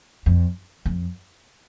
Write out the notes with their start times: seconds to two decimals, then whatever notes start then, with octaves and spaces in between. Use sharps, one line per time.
0.26 F2
0.85 F2